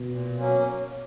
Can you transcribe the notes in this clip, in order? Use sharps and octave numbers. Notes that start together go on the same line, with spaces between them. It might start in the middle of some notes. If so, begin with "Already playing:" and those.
Already playing: B2
A#2
F#3 A#3 C#4